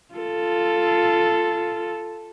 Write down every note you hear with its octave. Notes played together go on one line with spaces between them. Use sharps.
F4 A4